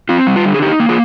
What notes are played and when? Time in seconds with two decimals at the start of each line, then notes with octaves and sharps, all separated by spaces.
0.09 C4 F4
0.27 G3
0.36 F4
0.44 D3
0.54 G#4
0.62 D#4 G4
0.80 A#3
0.89 F4 G#4